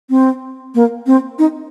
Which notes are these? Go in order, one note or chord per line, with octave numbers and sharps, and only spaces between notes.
C4
A#3
C4
D#4